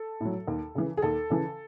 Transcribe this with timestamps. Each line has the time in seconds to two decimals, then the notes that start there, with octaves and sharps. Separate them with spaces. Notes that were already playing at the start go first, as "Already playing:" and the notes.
Already playing: A4
0.21 A2 F#3
0.48 D#2
0.75 C#3 E3
0.97 G#4
1.02 D#2 A4
1.30 C#3 E3